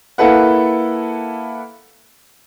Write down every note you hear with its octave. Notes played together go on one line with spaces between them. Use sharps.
A#3 E4 A4 B4 F#5